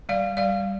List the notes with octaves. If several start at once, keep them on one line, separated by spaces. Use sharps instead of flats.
G3 D5 F5
G3 D5 F5